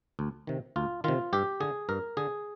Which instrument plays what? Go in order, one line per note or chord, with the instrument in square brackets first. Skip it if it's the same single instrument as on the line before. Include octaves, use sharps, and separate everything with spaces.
[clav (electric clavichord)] D2
C3 D#3
D2 F4
C3 D#3 F4
G2 G4
D3 G#4
G2 A#4
D3 G#4